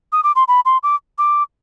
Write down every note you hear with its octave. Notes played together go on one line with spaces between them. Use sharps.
D#6
D6
C6
B5
C6
D6
D6